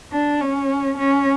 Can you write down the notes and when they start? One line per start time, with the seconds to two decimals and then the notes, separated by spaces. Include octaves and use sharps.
0.12 D4
0.40 C#4
0.97 C#4